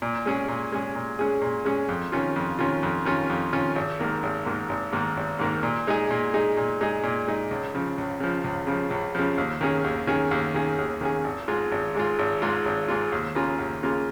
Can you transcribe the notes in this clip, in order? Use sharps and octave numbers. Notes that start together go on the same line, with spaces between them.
A#2
G#3 C#4 G#4
A#2
G#3 C#4 G#4
A#2
G#3 C#4 G#4
A#2
G#3 C#4 G#4
F2
D#3 C#4 F4
F2
D#3 C#4 F4
F2
D#3 C#4 F4
F2
D#3 C#4 F4
G#1
G#2 D#3 A#3
G#1
G#2 D#3 A#3
G#1
G#2 D#3 A#3
G#1
G#2 D#3 A#3
A#2
G#3 D#4 G#4
A#2
G#3 D#4 G#4
A#2
G#3 D#4 G#4
A#2
G#3 D#4 G#4
C#2
C#3 F3
C#2
C#3 F3
C#2
C#3 F3
C#2
C#3 F3
D#2
D#3 C#4 G#4
D#2
D#3 C#4 G#4
D#2
D#3 C#4 G#4
D#2
D#3 C#4 G#4
G#1
G#2 G#3 F4
G#1
G#2 G#3 F4
G#1
G#2 G#3 F4
G#1
G#2 G#3 F4
D#2
C#3 A#3 F4 G#4
D#2
C#3 A#3 F4 G#4